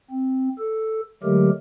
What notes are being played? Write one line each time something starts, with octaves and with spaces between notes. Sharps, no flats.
C4
A4
D3 F#3 G#3 A3 G4 A#4